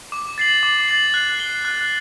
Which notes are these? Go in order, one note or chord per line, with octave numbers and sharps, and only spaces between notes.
D6
A6 C7 F#7
D6
A6 C7 F#7
F#6
C7 G7
F#6